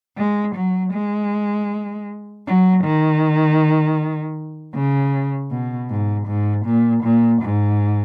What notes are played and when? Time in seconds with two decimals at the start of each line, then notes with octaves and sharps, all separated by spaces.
0.18 G#3
0.56 F#3
0.93 G#3
2.47 F#3
2.85 D#3
4.75 C#3
5.51 B2
5.90 G#2
6.27 G#2
6.66 A#2
7.04 A#2
7.42 G#2